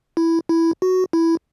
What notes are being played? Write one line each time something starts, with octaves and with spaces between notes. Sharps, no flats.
E4
E4
F#4
E4